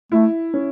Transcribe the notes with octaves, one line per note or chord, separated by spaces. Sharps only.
A3 E4
C#4